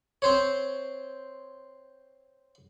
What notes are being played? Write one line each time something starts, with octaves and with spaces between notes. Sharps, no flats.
C4 C5 C#5